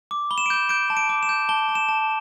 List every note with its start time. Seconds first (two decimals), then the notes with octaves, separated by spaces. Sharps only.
0.11 D6
0.31 B5 G7
0.38 E7
0.46 D7
0.50 G6 E7
0.69 G6 D7
0.90 A5
0.97 D7
1.09 D6
1.23 E7
1.29 G6
1.49 A5 G7
1.69 A5
1.75 E7
1.89 A5